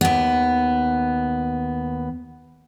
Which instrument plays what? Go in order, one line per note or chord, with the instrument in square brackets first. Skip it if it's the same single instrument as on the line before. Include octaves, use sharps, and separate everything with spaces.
[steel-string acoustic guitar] D#2 B3